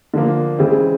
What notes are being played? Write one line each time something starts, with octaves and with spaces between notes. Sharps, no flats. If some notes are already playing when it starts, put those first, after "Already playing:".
D3 F3 A#3
C#3 E3 G#3 C4